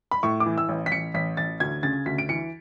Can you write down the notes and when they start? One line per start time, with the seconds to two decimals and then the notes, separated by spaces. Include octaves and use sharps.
0.11 B5
0.23 A2 C#6
0.40 D6
0.46 E3
0.58 E6
0.69 A1
0.86 B6
0.92 A1 C#7
1.14 A1 B6
1.37 A1 A6
1.60 D2 G#6
1.83 C#3 A6
2.06 D2 B6
2.18 D7
2.29 E3 C#7